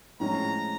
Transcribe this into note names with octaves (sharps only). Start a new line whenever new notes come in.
A2 F3 G#3 C#4 A#5